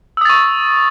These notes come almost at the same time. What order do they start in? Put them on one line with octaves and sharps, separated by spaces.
E6 D#6 A6 C#6